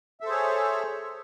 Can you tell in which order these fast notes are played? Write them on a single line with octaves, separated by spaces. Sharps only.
E5 A4 C5 G#4 C#5